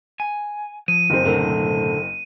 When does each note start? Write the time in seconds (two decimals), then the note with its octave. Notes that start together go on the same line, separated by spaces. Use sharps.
0.20 G#5
0.88 F3 D#7
1.10 F#1 C4
1.25 B1 A2 D3 A4 A#4